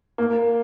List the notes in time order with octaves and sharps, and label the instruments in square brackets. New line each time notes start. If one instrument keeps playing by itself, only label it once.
[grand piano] A#3